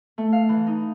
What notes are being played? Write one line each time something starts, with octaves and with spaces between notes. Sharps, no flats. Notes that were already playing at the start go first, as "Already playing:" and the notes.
A3
F5
E3
D#4